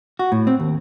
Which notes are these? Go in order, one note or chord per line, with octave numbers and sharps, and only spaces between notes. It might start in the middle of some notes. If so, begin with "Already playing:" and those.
F#4
A2
C4
D#2